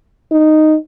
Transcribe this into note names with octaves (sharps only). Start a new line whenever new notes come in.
D#4